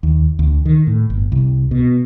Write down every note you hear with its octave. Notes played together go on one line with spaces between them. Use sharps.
D#2
D2
D#3
A2
G1
C2
B2